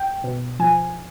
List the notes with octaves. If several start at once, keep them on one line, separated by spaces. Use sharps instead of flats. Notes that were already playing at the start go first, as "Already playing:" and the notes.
Already playing: G5
B2
F3 G#5